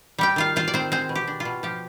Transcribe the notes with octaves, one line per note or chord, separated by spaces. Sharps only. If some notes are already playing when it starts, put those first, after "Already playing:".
G3 G4 G5
D#3 F4 F5
C4 F4 F5
D5
D#3 C4 C5
G#3 C4 C5
B2
G4
D4
F4
B2
F3 G4